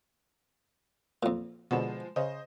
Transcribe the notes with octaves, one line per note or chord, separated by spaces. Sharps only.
F2 A#2
B2 D3 F3 G#3 E7
C#3 C5 D#5